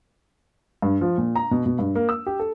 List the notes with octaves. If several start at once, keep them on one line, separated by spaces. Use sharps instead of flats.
G2
F3
A#2
A#5
B2
B2
G2
A#3
E6
G4
A4